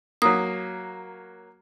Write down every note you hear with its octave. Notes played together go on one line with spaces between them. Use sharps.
F#3 A#3 D#6